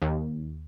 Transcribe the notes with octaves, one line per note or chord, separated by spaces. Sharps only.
D#2